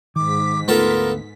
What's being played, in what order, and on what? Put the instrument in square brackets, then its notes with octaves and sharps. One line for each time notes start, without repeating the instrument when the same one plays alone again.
[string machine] G#2 B6 [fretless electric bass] D#3 [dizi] D6
[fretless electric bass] D2 A3 [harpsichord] B3 F4 A4 [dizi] A#4